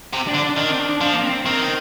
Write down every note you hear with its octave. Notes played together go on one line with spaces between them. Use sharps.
C3
D4
D3
D#3 D4
C4
D4
F3 D4
A#3
C4
D#3 C4